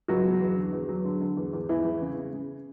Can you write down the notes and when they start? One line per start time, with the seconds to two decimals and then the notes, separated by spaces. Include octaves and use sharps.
0.08 C#2 F#3 F#4
0.25 B2
0.40 E2
0.57 D3
0.73 E2
0.89 F#3
1.05 D3
1.21 D3
1.37 E2
1.53 E2
1.69 E2 E3 E4
1.85 E2
2.01 C#3
2.18 C#3
2.33 C#3